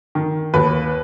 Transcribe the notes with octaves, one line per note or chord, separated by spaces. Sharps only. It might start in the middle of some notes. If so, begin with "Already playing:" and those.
D#3
D#2 B4